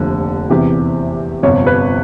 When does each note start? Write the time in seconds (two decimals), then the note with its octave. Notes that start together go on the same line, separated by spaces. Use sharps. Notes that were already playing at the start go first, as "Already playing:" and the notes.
Already playing: F1 D#2 D3 F3
0.50 E2 C3 E3 G4
1.43 G1 F2 C3 C#5
1.66 B4